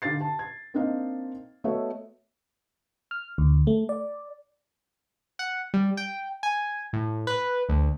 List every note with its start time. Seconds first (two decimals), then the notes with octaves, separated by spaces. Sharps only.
0.02 D3 D#4 G4 F5 A6 C7
0.21 A5
0.39 G#6
0.74 A#3 C4 D4 D#4 D#5 F5
1.64 A3 B3 F#4 C#5 D#5 E5
3.11 F6
3.38 D2
3.67 A3
3.89 D5
5.39 F#5
5.74 G3
5.97 G5
6.43 G#5
6.93 A2
7.27 B4
7.69 D2